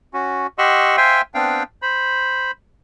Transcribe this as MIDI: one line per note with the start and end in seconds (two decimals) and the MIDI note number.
0.14 0.47 61
0.14 0.47 66
0.58 0.96 67
0.58 0.96 75
0.58 0.96 78
0.58 0.96 84
0.58 0.96 85
0.58 0.96 88
0.97 1.22 72
0.97 1.22 76
0.97 1.22 77
0.97 1.22 79
0.97 1.22 80
0.97 1.22 84
1.34 1.63 59
1.34 1.63 60
1.34 1.63 62
1.34 1.63 77
1.34 1.63 79
1.82 2.51 72
1.82 2.51 83